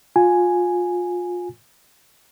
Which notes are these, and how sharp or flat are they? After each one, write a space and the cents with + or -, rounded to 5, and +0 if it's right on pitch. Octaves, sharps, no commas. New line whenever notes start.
F4 +25 G#5 +0